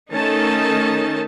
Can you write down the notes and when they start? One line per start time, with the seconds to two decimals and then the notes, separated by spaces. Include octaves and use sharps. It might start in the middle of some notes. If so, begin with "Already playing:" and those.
0.12 D#3 A3 C#4 D#4 A4 A5